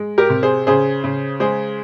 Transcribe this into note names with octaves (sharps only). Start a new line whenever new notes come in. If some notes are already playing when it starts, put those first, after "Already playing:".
Already playing: G#3
G4 A#4
C3
G#4 C5
C#3 G#4 C5
C#3
G#3 G#4 C5